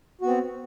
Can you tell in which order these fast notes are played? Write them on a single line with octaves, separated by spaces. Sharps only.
F#4 B3 C4